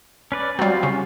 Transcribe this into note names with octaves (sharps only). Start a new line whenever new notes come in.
C#4 B4 D5
F#3 G3 C4 F4
C#3 C#4